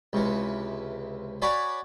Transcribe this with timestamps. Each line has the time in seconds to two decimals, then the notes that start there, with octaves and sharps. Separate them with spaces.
0.13 C#2 C3 E3
1.42 F#4 C#5 D5 G#5 B5